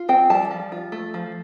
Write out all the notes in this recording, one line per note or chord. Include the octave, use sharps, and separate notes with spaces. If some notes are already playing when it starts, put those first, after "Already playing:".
Already playing: F4
C4 G5
G3 A5
F3
F4
A3
F3